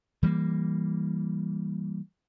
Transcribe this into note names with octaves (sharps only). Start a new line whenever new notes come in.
E3 G3 G#3 A#3